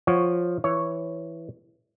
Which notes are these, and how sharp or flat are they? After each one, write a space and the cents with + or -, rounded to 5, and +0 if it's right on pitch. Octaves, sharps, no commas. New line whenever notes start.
F3 +5 C#5 +0 F#5 +0
E3 +5 C#5 +0